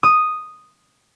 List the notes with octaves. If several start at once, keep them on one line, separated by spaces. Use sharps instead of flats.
D#6